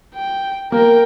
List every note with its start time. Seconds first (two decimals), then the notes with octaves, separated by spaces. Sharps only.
0.14 G5
0.72 A#3 A#4 G5